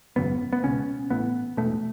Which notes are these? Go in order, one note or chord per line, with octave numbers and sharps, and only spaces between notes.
G#1 F#2 C#3 B3
B3
C#2 B2 C#4
A1 A2 B3
E1 E2 B2 A3